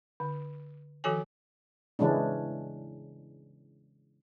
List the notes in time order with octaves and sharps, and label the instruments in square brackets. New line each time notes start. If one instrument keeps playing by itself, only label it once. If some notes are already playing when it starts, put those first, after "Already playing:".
[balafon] D3
D#3 F3 F#4 A4 C#5 G#5
[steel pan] C#3 E3 G#3 C#4 D4